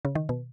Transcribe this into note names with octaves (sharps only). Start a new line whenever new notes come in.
C#3
D#3
B2